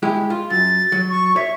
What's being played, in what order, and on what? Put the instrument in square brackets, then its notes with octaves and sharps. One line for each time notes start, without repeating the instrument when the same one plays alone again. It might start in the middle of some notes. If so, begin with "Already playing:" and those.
[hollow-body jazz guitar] G#3 E4 G4
F4
[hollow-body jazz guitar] F#2 [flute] A6
[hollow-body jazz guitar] F#3
[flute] C#6
[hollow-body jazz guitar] C#5 [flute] E5